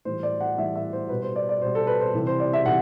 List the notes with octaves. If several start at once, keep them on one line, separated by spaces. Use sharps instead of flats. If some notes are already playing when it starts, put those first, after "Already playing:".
A2 E3 G3 C5
D5
F#5
A2 E3 G3 E5
E5
C5
B2 G3 B4
C5
D5
D5
B2 G3 C5
A4
B4
C5
C3 E3 G3
C5
D5
E5
C3 E3 F#5